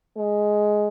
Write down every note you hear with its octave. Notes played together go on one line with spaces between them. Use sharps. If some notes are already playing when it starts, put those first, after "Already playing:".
G#3